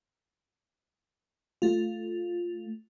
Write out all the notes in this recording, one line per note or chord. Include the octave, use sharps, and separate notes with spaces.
A3 F4